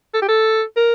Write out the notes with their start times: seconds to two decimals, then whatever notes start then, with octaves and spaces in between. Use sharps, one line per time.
0.14 A4
0.22 G4
0.28 A4
0.76 A#4